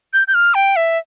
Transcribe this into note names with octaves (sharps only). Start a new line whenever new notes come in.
G6
G6
F6
G5
E5